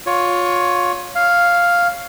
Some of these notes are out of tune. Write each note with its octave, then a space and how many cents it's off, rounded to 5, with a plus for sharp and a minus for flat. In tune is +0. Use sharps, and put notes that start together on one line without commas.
F4 +25 C#5 +15
C#5 +0 F5 +0